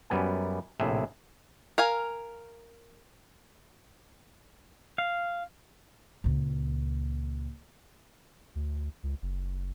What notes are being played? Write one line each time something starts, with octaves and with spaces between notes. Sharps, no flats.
F#2 G3 B3 G#5
A#1 A2 C3 G#4 E5
A#4 F5 G#5
F5
C#2 A#2
D2
C#2
F#1